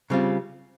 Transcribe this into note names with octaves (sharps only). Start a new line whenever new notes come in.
C#3 G3 C4 F4